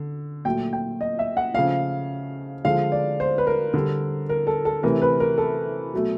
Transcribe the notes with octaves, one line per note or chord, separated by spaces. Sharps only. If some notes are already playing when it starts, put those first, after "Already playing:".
Already playing: D3
A#2 F#3 A3 G5
G5
D#5
E5
F#5
C#3 F3 A3 F5
D3 F3 G#3 F5
D5
C5
B4
A#4
D3 G3
A#4
A4
A4
C3 E3 A3 A#4
B4
A#4
A4
B2 F#3 A3